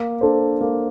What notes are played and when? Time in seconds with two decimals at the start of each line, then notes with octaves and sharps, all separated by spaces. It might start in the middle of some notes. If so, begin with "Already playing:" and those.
Already playing: A#3
0.21 D4 A4 C5
0.61 A#3